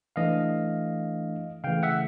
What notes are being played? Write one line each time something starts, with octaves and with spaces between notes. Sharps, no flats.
E3 A3 D4 D#5 F5
C#3 E3 A3 F5 G5
E5 F#5